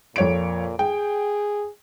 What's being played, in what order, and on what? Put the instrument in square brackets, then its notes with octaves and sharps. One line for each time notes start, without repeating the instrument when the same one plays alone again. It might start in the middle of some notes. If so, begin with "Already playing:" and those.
[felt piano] F2 C#5 D7 [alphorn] A#2
[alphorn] G#4 [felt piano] G5